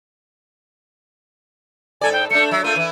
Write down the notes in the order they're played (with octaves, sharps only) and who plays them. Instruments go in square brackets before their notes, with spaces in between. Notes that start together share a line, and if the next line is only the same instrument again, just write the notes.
[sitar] G#2 A4 D5 [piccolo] G#5
[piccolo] G5
[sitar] A3 D4 [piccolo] C#7
[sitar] F#3 [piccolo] E5
[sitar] A3 A#3 F4 [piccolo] D#7
[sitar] E3 E4